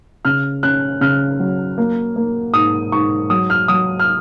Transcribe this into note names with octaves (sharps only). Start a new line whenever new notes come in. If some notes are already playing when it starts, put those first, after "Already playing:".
C#3 F6
C#4 F#6
C#3 F6
F#3
A#3
A#3
G#2 D#6
G#2 C#6
F#3 D#6
F6
F#3 D#6
F6